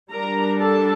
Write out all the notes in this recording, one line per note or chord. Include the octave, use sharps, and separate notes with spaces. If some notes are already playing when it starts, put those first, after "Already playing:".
G3 D4 A#4 A#5
A4 A5